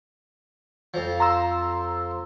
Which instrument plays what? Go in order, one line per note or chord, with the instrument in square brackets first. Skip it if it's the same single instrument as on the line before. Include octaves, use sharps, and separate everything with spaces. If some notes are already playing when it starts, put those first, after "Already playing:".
[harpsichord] F2 F3
[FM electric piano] A#5 C6 E6